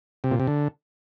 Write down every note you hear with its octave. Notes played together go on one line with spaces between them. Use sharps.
C3
A#2
C3
D3